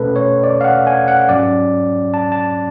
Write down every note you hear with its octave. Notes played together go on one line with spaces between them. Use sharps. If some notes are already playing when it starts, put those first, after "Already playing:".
Already playing: B2 A3 C#4 A4 B4
C#5
D5
F5
F#5
G#5
F#5
G#2 F#3 C#4 D5
A5
A5